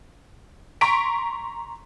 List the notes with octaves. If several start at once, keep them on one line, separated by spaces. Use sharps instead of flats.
A#5 C6 C#6 B6 D7